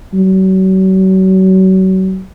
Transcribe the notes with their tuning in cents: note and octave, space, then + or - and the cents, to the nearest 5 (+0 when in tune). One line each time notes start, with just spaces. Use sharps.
F#3 +35